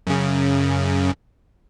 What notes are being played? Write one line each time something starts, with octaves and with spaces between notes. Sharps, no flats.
F#2 C#3